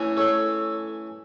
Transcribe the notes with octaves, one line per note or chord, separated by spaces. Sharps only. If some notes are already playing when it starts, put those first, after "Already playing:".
Already playing: E3 A3 C#4
A4 C#5